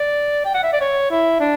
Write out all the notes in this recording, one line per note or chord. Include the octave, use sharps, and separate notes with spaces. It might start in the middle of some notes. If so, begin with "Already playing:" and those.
Already playing: D5
G5
F#5
E5
D5
C#5
E4
D4